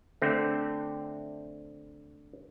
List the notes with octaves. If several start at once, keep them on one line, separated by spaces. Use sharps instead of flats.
D3 A3 C4